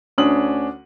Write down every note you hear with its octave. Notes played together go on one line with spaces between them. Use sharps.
D2 C#4 D4 D#6 F#7